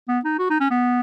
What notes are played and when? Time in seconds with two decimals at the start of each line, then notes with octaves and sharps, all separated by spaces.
0.09 B3
0.25 D#4
0.39 F#4
0.50 D#4
0.61 C#4
0.71 B3